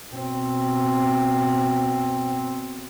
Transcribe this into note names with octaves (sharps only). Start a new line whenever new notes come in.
B2 C4